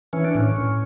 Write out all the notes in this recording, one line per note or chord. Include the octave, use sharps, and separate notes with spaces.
E3 C#4
D4
A2 C#4
A2